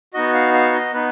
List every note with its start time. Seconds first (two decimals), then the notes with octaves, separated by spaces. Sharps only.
0.14 B3 D#4 F#4 D#5
0.34 F5
0.54 F5
0.74 D#5
0.93 B3 D#4 B4